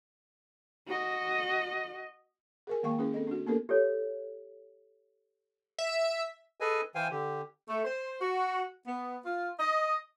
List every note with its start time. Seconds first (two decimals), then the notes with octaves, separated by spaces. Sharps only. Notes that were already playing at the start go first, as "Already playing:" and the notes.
0.87 F#4 D#5
2.67 G#4 A#4 G#5
2.83 D#3 G#3 A#3 F5 G5 C#6
2.99 C#4 E4 G#4 B4
3.14 C4 A4 D#5
3.27 D4 F#4
3.47 A#3 B3 D4 G4 A4 A#4
3.69 G4 A4 C#5
5.78 E5
6.60 G#4 A4 B4 D#5 G#5
6.95 E3 C5 F5 G5 G#5
7.11 D3 G4
7.69 A3
7.85 C5
8.21 F#4
8.87 B3
9.26 F4
9.60 D#5